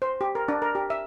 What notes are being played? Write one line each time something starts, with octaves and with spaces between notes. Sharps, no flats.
C5
G4
A#4
D4
A#4
G4
E5